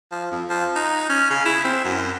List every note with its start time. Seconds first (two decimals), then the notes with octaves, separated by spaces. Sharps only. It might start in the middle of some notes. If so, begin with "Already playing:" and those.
0.12 F3
0.31 F2
0.50 F3
0.76 D#4
1.09 C#4
1.30 C#3
1.45 E4
1.65 C4
1.84 F#2